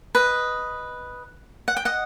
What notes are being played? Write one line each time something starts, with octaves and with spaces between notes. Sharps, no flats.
B4 D#5
F#5
G5
D#5 F#5